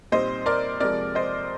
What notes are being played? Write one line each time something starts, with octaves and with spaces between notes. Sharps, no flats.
A#2 G3 C4 D#4 C5 D#5
A#4 D5
F2 C3 F3 G#3 A#4 D5
C5 D#5